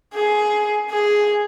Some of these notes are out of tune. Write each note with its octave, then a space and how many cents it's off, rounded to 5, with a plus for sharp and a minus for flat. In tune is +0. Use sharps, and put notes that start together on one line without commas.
G#4 +15
G#4 +0